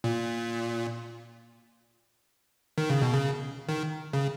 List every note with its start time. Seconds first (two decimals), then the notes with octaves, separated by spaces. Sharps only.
0.04 A#2
2.78 D#3
2.90 C#3
3.02 B2
3.14 C#3
3.69 D#3
4.13 C#3